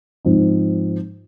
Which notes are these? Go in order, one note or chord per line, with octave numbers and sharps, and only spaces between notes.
G#2 F3 C4 D#4